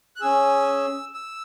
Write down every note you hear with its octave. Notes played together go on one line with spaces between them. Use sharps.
F#6
C#4 G#4 E6
E6